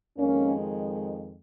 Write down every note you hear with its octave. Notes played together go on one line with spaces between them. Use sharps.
F2 D#3 G#3 A#3 C#4